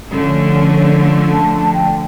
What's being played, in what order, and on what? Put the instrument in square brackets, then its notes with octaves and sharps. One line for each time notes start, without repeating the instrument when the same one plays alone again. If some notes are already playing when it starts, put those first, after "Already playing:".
[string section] D3 F3 A3 [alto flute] C#4
[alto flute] A5
G5